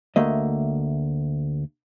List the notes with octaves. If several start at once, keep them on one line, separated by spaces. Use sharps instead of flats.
D2 A3 A#3 D#5